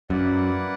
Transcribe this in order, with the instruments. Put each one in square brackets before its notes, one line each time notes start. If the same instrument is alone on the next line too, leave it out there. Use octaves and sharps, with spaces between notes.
[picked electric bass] F#2 [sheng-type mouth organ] A#3 E4 B4 D5 F#5